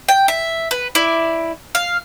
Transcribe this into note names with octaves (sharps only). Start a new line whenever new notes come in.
G5
E5
B4
E4 D5
F5